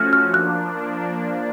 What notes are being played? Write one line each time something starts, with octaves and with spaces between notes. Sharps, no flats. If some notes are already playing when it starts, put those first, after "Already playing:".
Already playing: F3 A3 C#4 F#4 F6
F6
F3 A#3 D4 F#6